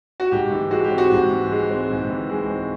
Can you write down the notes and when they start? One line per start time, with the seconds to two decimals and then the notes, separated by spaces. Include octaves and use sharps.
0.20 F#4
0.31 G#2 G4
0.51 E3
0.71 G#3 F#4
0.84 G4
0.91 C4
0.98 F#4
1.12 G#2
1.30 E3
1.51 G#3
1.70 C4
1.90 G#2
2.10 E3
2.30 G#3
2.49 C4